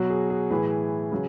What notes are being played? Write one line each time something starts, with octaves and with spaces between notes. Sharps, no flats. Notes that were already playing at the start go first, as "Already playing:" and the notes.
Already playing: B2 F#3 F#4
G#4
G#4
A2 E3 G#4 B4
C#3 F#3